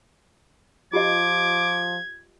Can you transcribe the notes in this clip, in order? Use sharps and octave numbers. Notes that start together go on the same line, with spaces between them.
F3 F4 G4 D#5 D6 G#6